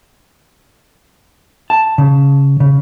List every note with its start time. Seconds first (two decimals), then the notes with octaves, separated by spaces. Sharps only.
1.70 A5
1.98 C#3
2.60 C#3